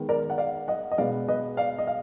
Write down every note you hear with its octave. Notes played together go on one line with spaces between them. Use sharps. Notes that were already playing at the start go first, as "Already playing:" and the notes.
Already playing: D#3 G#3 B3
A#4 D5
F#5
D5 F5
D#5 F#5
D#5
B2 G#3 B3 D5 F5
B4 D#5
D5 F5
D#5
F5